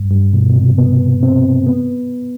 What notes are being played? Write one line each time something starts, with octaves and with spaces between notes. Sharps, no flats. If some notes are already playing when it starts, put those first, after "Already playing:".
Already playing: G2
G2
B2
B2
C3
B3
C4
B3